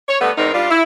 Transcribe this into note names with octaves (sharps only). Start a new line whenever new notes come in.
C#5
G2 A3 B3
E2 G#2 C4 D#4 A#4
G3 D4 F4
E4